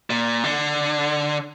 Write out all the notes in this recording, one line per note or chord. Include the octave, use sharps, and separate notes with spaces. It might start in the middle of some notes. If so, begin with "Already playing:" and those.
A#2
D3